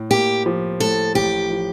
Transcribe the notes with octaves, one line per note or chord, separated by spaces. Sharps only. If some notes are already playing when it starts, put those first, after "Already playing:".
Already playing: A2
A#3 G4
F3
A2 A4
A1 G4
F3